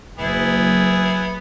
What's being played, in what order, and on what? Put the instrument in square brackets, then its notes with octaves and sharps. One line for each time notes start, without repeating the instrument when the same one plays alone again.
[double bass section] F#1 [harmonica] B3 E4 G#4